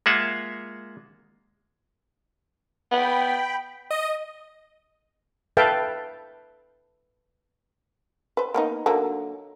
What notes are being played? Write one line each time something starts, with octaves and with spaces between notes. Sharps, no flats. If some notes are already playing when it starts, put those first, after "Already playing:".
G#3 A#3 F4 E5 F#5
B3 G5 B5
D#5
A4 B4 E5 F5 G5 A5
B4 C5
A#3 B3 D#4
D3 F#3 A#3